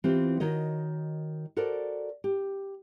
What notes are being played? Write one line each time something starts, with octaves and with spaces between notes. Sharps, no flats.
E3 C4 F4 G4
D#3 F#4 C#5 D#5
F#4 A4 A#4 C5 D5
G4